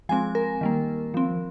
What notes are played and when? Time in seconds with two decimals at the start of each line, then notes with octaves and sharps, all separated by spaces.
0.09 F3 G#3 C4 G#5
0.35 A#4
0.61 D#3 G3 A#3
1.14 F3 C4